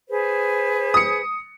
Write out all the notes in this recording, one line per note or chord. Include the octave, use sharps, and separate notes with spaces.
G#4 B4 C5
D#6 C#7